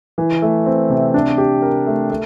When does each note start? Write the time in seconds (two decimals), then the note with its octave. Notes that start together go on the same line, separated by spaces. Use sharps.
0.18 E3
0.42 A3
0.66 C4
0.90 C3
1.14 D4
1.38 G4
1.62 A#4
1.87 A3
2.10 A3